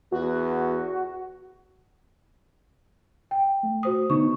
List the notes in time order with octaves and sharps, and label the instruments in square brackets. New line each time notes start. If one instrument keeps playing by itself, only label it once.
[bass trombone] E2 [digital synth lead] F#4
[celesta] G5
[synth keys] A3
[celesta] F#4 C5 D#6
[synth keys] D3 B3 D#4 [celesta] C#6